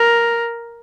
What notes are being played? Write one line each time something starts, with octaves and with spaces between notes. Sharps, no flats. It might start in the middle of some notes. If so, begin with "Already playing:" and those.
Already playing: A#4